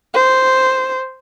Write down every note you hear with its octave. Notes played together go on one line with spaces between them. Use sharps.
C5